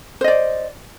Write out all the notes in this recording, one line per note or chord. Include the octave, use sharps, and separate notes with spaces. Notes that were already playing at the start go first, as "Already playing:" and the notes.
C5 D5 D#5